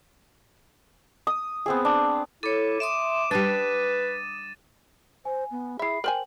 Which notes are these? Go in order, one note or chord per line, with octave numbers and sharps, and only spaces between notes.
D#6
B3 C4 G#4
D4
E4 A4 C#5 D6 D#7
E5 C6 D6 D#6 E7
G3 D4 B4 D#6 A6 D#7
C5 G#5
B3
E4 G#4 E5 B5 C7
A#4 C5 G5 G#5 F#7